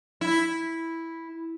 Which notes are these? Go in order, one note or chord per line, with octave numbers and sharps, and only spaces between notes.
E4